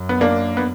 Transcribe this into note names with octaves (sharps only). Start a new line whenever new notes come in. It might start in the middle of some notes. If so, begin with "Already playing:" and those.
Already playing: F#2
B3
A#3 D4
B3